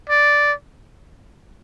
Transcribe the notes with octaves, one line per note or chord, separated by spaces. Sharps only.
D5